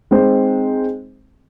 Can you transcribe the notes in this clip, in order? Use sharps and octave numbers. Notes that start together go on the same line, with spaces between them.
G#3 C4 D#4 G#4 C5